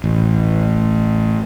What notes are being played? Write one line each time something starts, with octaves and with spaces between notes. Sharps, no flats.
A1